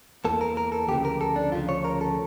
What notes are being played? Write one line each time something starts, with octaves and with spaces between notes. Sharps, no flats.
E2 E3 A#3 A4
A#4
A#4
A4
D2 C#3 F3 G4
A#4
A4
D4
D2 C#3 F3 F4
C#5
A#4
A4